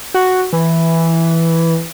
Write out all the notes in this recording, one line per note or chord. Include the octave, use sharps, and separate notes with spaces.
F#4
E3